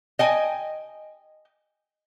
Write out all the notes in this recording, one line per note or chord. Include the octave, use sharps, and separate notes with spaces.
D#5 G5 G#5